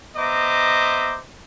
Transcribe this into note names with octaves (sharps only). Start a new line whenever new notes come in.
B3 C5 D#5 E5 A#5 D6